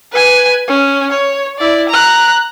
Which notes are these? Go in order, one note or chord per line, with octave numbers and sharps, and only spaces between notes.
B4 G#5
C#4
C#5
E4 D5
A#5 F#6